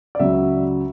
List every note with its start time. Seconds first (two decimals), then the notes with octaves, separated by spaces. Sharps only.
0.15 D5
0.19 C#2 C#3 F#3 E5